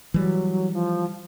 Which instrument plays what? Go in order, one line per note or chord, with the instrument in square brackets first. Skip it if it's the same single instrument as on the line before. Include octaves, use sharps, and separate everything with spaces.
[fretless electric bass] E3 G3 [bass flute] F#3
[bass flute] F3